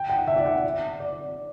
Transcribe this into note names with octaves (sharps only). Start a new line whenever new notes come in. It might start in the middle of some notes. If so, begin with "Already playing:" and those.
Already playing: G5
F#5
E5
D5
F#5
D5